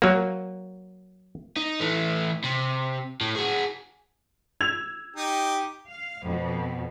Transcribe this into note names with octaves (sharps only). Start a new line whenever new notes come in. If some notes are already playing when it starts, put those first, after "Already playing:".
F#3 A#3
D#4
E3 A3
C3
A2
F#4 G#4
E6 G#6 F7
D#4 G4
F5
F2 B2